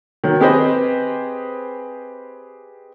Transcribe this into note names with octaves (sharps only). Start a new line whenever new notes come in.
D#3 F#3
C4 G4 G#4 B4 C5 D#5